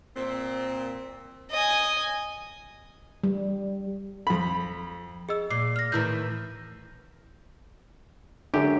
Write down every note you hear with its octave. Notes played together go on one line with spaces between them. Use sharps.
A#2 C4
D#5 G#5
G3
F2 B5
G#4 D#5 E6
A#2 D6 C7
F6 A#6
A2 D#3 E3 E4 E6 G6
F#2 D3 G#3 G4